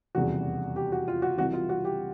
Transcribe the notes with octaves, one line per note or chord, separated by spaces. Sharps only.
F1 E2 C#3 E3 G3 F#4
G4
F#4
F4
F#4
C2 C3 E3 F#4
F4
F#4
G4